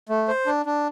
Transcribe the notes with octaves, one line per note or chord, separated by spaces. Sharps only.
A3
C5
D4
D4